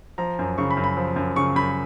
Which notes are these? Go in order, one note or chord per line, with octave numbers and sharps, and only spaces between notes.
F3 A#5
F#2
C#3 C#6
B5
F#2
B5
F3
F#2
C#3 C#6
F#2 B5